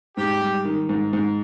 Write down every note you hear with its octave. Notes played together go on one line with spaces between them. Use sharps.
G#2 G4
G3
D#3
G#2
G#2